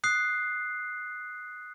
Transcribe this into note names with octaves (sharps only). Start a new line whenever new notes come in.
D#6 F#6 C7